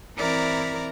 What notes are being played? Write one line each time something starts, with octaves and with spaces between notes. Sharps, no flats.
E3 C4 E4 A#4 D5 A#5